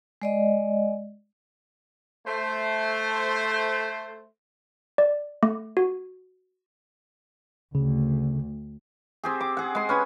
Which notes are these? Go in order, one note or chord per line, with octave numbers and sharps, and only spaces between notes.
G#3 D5 D#5
A3 C5
D5
A3
F#4
D2 C#3
C4 G4 G#4
D6
G#4 F#5
G#3 C6
C#4 B4 G#5